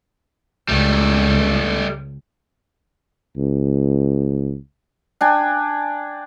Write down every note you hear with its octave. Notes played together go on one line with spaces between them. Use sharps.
C#2 G3 A3
C#2
D4 G5 G#5